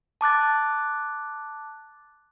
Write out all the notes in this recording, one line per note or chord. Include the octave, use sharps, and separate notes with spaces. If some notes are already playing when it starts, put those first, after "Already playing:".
A5 D6 F#6 A6